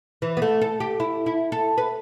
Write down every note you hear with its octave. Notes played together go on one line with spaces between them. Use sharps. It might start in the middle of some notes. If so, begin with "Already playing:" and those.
E3
B3
A3
A4
G4
E4
E4
A4
B4